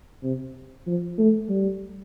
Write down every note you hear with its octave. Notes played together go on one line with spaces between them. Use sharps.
C3
F3
A3
G3